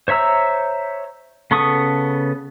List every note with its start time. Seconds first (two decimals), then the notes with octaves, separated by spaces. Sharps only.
0.08 C5 C#5 E5 A#5 E6
1.51 C#3 B3 A4 C#6 D#6